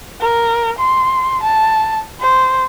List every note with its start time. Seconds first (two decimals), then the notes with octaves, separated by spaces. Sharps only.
0.21 A#4
0.78 C6
1.43 A5
2.20 C5